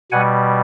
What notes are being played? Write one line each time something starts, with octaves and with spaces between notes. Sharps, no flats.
B2 G3 F#5 G#5